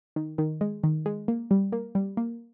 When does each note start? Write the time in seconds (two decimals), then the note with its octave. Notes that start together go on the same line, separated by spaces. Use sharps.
0.16 D#3
0.38 D#3
0.61 G#3
0.84 D#3
1.06 G#3
1.28 A#3
1.51 G3
1.72 A#3
1.95 G3
2.17 A#3